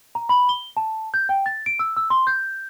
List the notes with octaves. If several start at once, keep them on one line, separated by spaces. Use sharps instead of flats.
A#5
B5
G7
A5
G6
G5
A6
D7
E6
E6
C6
G6